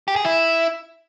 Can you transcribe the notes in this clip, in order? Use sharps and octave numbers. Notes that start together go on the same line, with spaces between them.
G4
G#4
E4